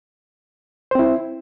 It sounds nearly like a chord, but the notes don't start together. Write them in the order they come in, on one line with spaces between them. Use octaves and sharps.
C5 C4 E4